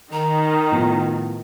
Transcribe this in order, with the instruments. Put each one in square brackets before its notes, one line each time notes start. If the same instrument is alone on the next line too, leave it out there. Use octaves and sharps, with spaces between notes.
[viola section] D#3 [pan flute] A#5
[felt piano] A2 F3 B3